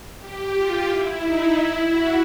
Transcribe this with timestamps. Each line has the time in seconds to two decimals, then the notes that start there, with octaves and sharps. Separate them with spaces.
0.19 G4
0.55 F4
0.88 E4
1.22 D#4
1.56 E4
1.91 F#4